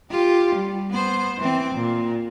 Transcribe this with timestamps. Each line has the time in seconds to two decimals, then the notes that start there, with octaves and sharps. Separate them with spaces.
0.10 F4 G4
0.55 G3
0.90 B3 C5
1.38 E3 C4
1.74 A#2